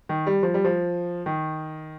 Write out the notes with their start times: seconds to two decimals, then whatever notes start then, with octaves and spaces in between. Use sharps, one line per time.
0.09 D#3
0.27 G3
0.43 F3
0.54 G3
0.65 F3
1.26 D#3